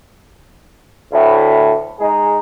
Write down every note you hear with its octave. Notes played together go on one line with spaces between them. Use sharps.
D2 A2 E4
G#3 D#4 G#4